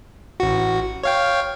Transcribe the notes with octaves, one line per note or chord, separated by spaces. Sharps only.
A1 F#4
C#5 F5 G5